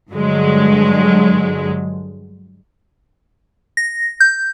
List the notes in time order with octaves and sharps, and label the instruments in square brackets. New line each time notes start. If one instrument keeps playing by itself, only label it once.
[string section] G2 D3 F#3 G#3
[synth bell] A#6
G6